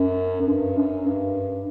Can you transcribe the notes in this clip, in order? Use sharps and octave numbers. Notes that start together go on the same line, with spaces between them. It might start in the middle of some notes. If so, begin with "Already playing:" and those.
Already playing: F#2
F#2
G2
F#2
G2